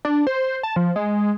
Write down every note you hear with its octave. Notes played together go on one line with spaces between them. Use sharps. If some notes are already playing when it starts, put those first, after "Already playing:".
D4
C5
A5
F3
G#3